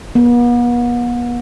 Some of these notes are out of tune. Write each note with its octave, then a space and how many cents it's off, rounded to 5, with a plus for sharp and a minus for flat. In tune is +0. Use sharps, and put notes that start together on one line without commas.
B3 -40